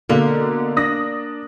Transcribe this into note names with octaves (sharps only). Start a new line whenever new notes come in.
B2 D3 A#3
D4 D#6 A#6